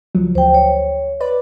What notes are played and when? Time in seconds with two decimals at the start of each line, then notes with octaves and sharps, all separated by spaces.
0.15 C#2 F3 F#3
0.35 D2 C5 G5
0.54 C#5
1.21 B4 D5